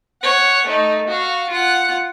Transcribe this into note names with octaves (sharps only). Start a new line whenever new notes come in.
C#5 F#5
A3 D#4
F#4 F5
F4 F#5